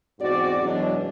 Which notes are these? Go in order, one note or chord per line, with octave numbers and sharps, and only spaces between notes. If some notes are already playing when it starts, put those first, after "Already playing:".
E2 G#2 C4 F#4 D5
F#2 B2 E3 F#3 G#3 D4